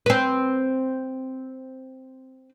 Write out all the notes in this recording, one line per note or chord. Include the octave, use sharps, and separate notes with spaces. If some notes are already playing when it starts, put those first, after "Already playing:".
C4 B4